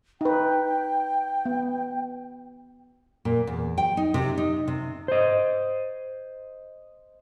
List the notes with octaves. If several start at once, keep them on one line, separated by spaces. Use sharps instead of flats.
D#4 B4 G5
B3
A#2
E2
G5
D#4
C3
D#4
C3
C5 D#5